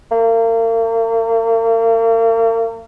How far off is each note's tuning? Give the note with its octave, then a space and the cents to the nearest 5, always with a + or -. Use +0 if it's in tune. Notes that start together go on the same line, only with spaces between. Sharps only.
A#3 -40